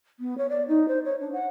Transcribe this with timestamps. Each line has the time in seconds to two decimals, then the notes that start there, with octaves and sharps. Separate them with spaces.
0.20 B3
0.38 C#5
0.50 D5
0.68 D#4
0.88 C5
1.05 C#5
1.21 D4
1.33 F#5